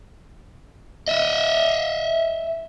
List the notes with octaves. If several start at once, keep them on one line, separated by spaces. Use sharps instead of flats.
D#5 E5